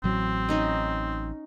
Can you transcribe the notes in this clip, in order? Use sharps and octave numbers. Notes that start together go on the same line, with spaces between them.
A1 F#3 C4
C#4 D#4 D#5